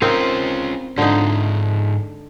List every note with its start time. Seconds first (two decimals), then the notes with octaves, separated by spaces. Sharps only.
0.02 C4 C#4 D#4 F4 A#4
0.98 G#2 D3 D#4 F4